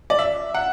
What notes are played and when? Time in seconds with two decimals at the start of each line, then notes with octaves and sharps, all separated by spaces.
0.10 D5
0.19 E5
0.54 F#5